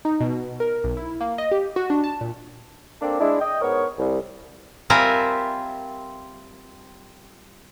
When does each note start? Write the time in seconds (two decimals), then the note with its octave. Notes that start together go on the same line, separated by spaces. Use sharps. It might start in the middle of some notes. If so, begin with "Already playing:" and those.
0.05 D#4
0.20 B2
0.60 A#4
0.84 B1
0.97 E4
1.21 A#3
1.38 D#5
1.51 G4
1.76 F#4
1.90 D4
2.04 A5
2.21 A#2
3.01 A#3 C4 D4 A4 D5
3.20 G#3 D4 E4
3.41 D#5 G5
3.61 G#2 B3 A#4 C#5
3.98 C2
4.90 G3 C4 F4 A#4 E5 G#5